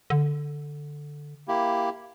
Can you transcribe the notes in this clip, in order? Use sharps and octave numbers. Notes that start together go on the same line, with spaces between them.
D3
A#3 E4 G4